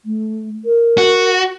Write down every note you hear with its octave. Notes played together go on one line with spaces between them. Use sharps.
A3
A#4
F#4